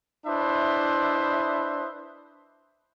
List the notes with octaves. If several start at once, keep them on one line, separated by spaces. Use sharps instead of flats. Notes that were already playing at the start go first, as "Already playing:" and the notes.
D4 E4 B4 C5 D#5 E5